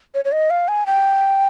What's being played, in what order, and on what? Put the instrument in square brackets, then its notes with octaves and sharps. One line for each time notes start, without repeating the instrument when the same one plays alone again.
[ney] C#5
C#5
D#5
F5
G#5
G5